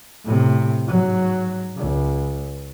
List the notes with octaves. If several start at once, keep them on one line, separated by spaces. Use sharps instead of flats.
A2 C3
G#2 F#3
C#2